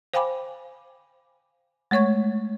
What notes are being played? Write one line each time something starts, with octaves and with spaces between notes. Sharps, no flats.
C5 F5 G5 G#5 B5 D6
G#3 A3 C#5 C#6 G#6